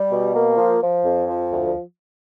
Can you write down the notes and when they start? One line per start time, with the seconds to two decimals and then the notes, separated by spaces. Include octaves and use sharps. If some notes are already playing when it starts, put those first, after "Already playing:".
Already playing: G3
0.11 B2
0.35 A#3
0.57 F3
0.82 F3
1.05 F2
1.27 F3
1.51 D2